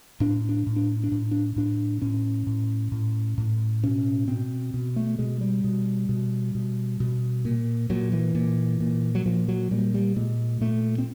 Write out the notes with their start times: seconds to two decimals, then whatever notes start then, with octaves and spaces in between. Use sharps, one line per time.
0.20 A2 D4
0.49 D4
0.67 A2
0.76 D4
1.04 D4
1.12 A2
1.31 D4
1.56 A2 D4
2.02 A2 C#4
2.47 A2
2.92 A2
3.38 A2
3.83 B2 C#4
4.28 B2 C4
4.74 B2
4.96 A3
5.19 B2 G#3
5.41 G3
5.64 B2
6.09 B2
6.55 B2
7.00 B2
7.45 A#2
7.90 A#2 F#3
8.12 E3
8.35 A#2
8.80 A#2
9.15 F#3
9.26 A#2 F3
9.48 F#3
9.71 A#2 G3
9.94 G3
10.16 A#2 G#3
10.61 A#2 A3
10.98 C4